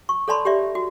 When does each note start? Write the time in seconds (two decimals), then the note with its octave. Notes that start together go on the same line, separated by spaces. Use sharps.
0.09 C#6
0.28 A4 C#5 D5 A5 B5 C6
0.45 G4 C#5 D5 E5
0.75 F#4